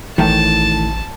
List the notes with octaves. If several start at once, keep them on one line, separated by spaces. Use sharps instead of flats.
A1 A2 D#3 E3 A5